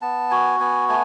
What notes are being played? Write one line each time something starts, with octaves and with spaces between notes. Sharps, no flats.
B3 A5
F#4 G#5
B3 G#5
A3 G#5